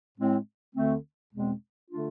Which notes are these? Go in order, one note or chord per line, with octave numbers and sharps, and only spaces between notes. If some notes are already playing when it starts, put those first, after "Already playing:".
A2 G#3 C4
D2 D3 A3 C4
E2 B2 G#3 C4
D3 A3 D4 F4